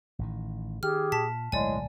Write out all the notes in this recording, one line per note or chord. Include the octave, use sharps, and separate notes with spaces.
A1 A2 D#3
D#3 G4 G#4 F6
A#2 A5 B6
D1 B1 A2 G#3 A3 D5 G#5